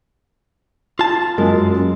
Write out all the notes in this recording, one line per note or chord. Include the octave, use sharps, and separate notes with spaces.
F4 A5
F#2 G#3 A#3